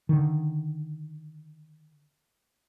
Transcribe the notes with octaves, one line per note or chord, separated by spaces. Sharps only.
D3 D#3